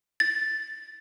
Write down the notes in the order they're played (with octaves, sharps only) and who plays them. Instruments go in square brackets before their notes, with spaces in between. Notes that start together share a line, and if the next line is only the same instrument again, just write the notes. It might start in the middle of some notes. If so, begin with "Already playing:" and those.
[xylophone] A6